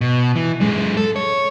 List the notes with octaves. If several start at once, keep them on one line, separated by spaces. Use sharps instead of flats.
B2
E3
F#2 G#3
A4
C#5